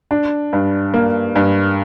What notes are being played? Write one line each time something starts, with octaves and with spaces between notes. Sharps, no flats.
D4
G2
A#3
G2